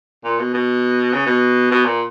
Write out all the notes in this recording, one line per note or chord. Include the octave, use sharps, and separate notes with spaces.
A#2
B2
B2
C#3
B2
B2
A#2